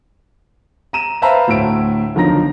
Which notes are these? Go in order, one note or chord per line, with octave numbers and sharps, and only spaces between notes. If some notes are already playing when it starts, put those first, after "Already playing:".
A#5 D#7 E7
B4 C5 E5 F5 A5 A#5
D2 A2 E5 D7
B1 D3 D#3 F3 A#5 A#6